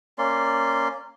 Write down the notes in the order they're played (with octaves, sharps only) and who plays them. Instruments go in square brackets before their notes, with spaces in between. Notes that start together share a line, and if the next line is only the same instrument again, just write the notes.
[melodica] A#3 C#4 D5 C6